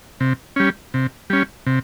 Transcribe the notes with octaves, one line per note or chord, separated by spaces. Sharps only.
C3
G3 C#4
C3
G3 C#4
C3